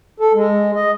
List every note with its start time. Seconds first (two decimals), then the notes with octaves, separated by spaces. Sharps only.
0.20 A4
0.34 G#3
0.75 D#5